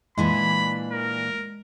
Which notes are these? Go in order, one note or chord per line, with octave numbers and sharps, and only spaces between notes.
A#2 E3 G#3 D4 B5
A#4